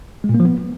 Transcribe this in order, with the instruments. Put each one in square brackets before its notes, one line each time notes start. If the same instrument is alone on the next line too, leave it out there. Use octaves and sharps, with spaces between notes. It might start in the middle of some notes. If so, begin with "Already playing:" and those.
[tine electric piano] G#3
A#2
A#3
F3
B3